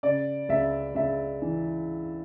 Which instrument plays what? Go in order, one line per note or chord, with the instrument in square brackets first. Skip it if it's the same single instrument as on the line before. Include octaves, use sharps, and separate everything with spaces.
[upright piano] C#3 D5
C#2 E5
C#2 E5
E3